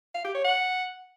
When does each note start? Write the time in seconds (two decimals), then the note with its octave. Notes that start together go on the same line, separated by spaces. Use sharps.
0.15 F5
0.25 G4
0.34 C#5
0.44 F#5